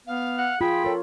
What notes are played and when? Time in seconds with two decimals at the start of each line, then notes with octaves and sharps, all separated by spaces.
0.07 B3 F5
0.38 F#5
0.61 F4 G#4 G5 B5
0.84 A4 A#4 C#5